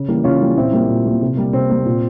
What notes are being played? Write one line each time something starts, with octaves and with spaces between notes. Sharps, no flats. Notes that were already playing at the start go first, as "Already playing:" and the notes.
Already playing: C#3
E3 G3 A#3
C#3 C#4 F4
E3 G3 A#3
A#2 C4 E4
G3 A#3
A#2
G3 A#3
C3
G3 A#3
C3 C4
G3 A#3
A#2